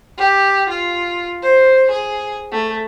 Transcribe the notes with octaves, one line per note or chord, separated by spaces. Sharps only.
G4
F4
C5
G#4
A3